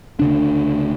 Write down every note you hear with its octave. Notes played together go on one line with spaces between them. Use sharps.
D2 C#3 D4